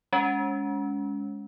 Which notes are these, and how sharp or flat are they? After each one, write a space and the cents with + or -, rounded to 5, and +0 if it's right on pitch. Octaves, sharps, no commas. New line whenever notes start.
G#3 +0 C#4 +25